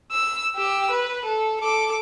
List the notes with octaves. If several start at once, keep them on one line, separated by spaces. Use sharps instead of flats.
E6
G4 E6
B4
A4
A4 D6